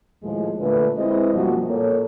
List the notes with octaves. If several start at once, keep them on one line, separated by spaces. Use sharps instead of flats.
D#2 A2 F3 G#3
A#2 D3 A3 F4 B4
G#3 C4 E4 B4 C5 D#5
F#2 B2 F3 G3 A#3 F#4
A#2 A#3 A4 C#5